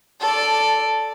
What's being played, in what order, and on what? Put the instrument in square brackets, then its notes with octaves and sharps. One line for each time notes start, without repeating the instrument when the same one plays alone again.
[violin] A4 D5